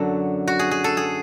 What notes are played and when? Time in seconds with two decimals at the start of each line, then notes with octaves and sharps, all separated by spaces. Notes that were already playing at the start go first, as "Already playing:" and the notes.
Already playing: F#2 D3 F#3 A4
0.48 F#4
0.59 G#4
0.71 G#4
0.84 A4
0.97 G#4